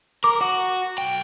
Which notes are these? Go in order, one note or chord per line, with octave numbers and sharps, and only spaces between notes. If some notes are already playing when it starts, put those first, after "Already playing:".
A#4 D6
F#4
B1 G5